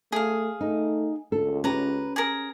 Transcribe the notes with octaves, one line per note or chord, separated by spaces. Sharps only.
A3 G#4 F5
A3 D#4
C#2 A4
C#4 G4 B4 A#5
G#4 A#4